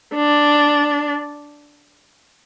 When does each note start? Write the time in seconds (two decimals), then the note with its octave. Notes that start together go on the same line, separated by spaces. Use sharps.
0.15 D4